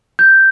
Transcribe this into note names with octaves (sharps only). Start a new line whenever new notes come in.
G6